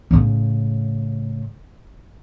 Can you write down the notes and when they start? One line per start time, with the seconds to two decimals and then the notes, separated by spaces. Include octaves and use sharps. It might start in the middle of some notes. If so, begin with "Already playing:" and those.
0.11 A2 C#3